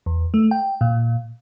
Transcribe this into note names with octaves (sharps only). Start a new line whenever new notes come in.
E2
A3
G5
A#2